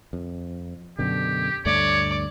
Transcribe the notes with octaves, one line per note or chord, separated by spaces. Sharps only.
F2
F#2 B2 D3 G4
D2 G2 A3 C#5 D5